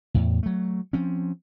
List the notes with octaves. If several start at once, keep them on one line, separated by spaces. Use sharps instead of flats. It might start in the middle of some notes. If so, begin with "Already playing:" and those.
E2 A2
F#3 A3
F3 C4 C#4